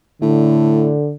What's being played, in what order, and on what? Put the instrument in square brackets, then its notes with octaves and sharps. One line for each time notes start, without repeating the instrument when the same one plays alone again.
[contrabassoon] A2 [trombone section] D3